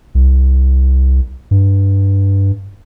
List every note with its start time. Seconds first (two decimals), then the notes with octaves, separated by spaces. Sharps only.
0.15 C2
1.51 G2